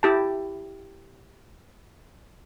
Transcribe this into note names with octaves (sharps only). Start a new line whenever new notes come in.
E4 G4 A5